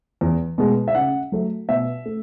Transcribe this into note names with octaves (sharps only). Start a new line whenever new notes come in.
E2
B2 G#3
E5
C#3 F#5
F#3 A3
B2 E5
A3